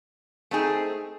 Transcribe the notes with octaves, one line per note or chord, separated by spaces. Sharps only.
A3 C4 D#4 G#4